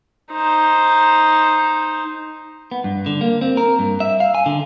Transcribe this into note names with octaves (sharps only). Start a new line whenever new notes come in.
D#4 C5
B3
G2
D3
A#3
C4
A#4
G2
E5
F5
G#5
D3